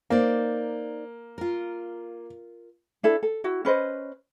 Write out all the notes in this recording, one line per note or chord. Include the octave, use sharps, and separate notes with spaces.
A#3 D#4 C5 D5
F4 A#4
D4 E4 A4
A4
E4 F#4
C#4 B4 C5 D#5